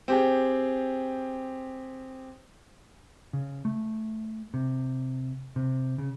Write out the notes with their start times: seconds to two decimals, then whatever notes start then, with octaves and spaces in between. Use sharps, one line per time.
0.08 C4 G4 G#4
3.33 C#3
3.65 A3
4.54 C3
5.56 C3
5.98 C#3